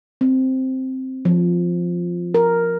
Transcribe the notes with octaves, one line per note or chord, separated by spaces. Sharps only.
C4
F3
A#4